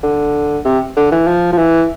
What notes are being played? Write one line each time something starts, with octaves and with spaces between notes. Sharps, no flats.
D3
C3
D3
E3
F3
F3
E3